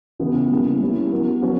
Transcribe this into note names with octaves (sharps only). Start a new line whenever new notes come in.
C#3 E3 B3
C#3 G3 A#3 E4
G3 C#4 E4
F#3 B3 F#4 A#4
F#3 C#4 F#4 B4